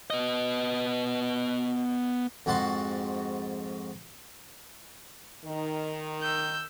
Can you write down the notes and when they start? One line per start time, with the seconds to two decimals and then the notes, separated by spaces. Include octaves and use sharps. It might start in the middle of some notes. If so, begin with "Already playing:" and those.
0.10 B3 D#5
2.46 F2 G#2 F#4 A5 C6
5.46 D#3
6.21 E6 G6